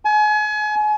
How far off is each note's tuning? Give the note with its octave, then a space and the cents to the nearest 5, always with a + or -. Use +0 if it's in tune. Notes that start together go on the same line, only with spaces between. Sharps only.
G#5 +35